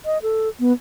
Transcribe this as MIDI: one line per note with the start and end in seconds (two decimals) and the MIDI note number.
0.05 0.21 75
0.22 0.49 69
0.60 0.72 59